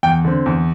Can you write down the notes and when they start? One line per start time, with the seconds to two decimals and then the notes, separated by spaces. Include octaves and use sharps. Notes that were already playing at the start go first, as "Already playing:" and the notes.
0.03 E2 G5
0.24 D3 C4
0.46 E2